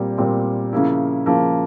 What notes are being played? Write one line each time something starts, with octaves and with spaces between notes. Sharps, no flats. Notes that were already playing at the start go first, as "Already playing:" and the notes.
Already playing: A#2 G3 C4
A#2 G3 C4
C#3 F3 A#3 E4
C#3 F3 A#3 E4